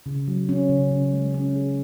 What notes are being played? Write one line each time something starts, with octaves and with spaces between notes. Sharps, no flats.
C#3
F#3
C#4
C#3
C#3
G#3
C#4
G#4